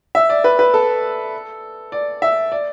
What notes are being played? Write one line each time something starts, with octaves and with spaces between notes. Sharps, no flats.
E5
D5
B4
B4
A4
D5
E5
D5